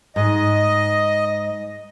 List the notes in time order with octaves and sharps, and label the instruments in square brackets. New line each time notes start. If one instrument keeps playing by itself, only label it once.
[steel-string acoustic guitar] G#2 [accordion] D#5